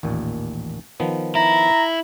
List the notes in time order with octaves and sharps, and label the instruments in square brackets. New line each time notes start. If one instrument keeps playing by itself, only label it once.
[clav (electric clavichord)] A1 D#2 A#2
D#3 F3 B3
[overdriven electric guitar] E4 [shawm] A#5